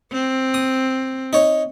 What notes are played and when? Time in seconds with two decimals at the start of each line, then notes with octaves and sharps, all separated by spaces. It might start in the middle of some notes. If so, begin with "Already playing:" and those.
0.12 C4
0.54 D#6
1.33 D#4 C#5